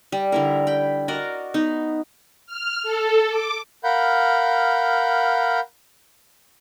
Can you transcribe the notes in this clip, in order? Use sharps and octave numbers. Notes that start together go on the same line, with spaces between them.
G3
D3 E4 A#4
G5 B5
F#4 A#4 D5 D#5
B3 D#4
F6
A4
D6
A#4 F5 F#5 B5 G6